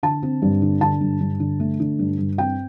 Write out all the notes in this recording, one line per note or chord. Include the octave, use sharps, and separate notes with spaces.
D3 A5
C4
G2
D3
D3 A5
G2
G2
D3
A3
D3
G2
G2
C4 G5